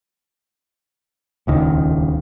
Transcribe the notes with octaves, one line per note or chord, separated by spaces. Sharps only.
D#1 C#2 D#3